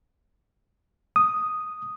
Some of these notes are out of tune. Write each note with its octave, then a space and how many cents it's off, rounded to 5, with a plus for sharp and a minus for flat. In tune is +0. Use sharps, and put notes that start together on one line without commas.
D#6 +0